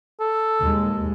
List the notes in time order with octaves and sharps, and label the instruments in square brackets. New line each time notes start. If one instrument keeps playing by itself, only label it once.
[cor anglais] A4
[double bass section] D#2 G#3